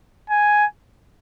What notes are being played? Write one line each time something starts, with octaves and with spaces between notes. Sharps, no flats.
G#5